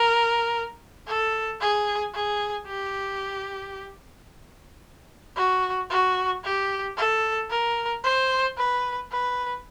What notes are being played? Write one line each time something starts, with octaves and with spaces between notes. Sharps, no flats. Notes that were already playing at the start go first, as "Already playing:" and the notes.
Already playing: A#4
A4
G#4
G#4
G4
F#4
F#4
G4
A4
A#4
C5
B4
B4